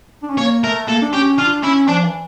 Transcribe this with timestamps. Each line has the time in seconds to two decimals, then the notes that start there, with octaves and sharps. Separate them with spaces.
0.23 D4
0.30 C#4
0.38 A#3 C#5
0.63 A3 A#4
0.88 A#3 A4
1.02 D4
1.13 C#4 G4
1.38 D4 F4
1.63 C#4 E4
1.88 F3 D4
2.04 E3